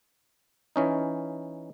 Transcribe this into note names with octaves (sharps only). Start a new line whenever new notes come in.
E3 C#4 D#4